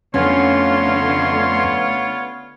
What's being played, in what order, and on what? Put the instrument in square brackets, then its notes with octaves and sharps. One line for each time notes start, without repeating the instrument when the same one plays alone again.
[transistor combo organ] F2 C6 [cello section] D3 A3 [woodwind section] B3 F4 C#5 [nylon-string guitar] C#4